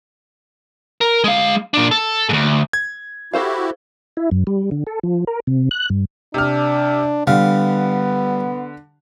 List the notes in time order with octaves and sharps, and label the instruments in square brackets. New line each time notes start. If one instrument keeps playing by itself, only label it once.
[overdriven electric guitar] A#4
G#3 F5
A#2 D4
A4
D2 G#2
[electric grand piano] G#6
[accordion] E4 F#4 G4 [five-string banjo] A4 C5 F5
[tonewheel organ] E4
F#2
G3
D3
A4
F3
A#4
C3
F#6
G2
[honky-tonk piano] C3 F6 [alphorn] D4
[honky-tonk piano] D3 [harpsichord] G3 F5 [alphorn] B3